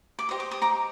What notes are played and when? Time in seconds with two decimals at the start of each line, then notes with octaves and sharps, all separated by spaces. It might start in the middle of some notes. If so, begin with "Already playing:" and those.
0.19 D6
0.29 G4 C5 D#5 D#6
0.40 D6
0.51 D#6
0.62 A#5 D6